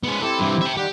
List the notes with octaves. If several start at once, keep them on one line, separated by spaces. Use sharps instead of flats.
G#3 B3 C#4
C4 E4 G4 A4
G2 E3
E5 G5
D#3 G3 G4 F#5